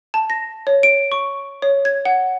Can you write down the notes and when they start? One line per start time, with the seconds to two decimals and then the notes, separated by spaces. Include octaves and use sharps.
0.14 A5
0.30 A#6
0.67 C#5
0.83 D7
1.12 C#6
1.62 C#5
1.85 G#6
2.05 F#5